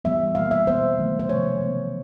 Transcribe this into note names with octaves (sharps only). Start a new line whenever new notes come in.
E3 G3 B3 E5
B2 G3 A#3 F5
E5
B2 G#3 B3 C5
D#3 F#3 A3
C5
C3 F3 A3 C#5
E3 G#3 B3